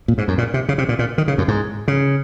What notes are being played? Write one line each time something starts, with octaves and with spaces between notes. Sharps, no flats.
A#2
G#2
F#2
A#2
C3
C#3
C3
A#2
A#2
D#3
C#3
F#2
G#2
C#3